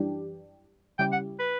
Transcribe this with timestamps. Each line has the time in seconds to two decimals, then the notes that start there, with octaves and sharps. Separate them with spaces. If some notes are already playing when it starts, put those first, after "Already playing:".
Already playing: F#2 E3 G3 D4 G4
0.99 C#3 G3 C#4 E4 G4 G5
1.12 F#5
1.39 B4